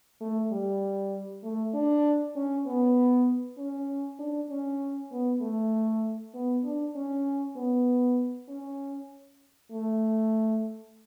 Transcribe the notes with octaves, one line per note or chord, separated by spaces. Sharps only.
A3
G3
A3
D4
C#4
B3
C#4
D4
C#4
B3
A3
B3
D4
C#4
B3
C#4
A3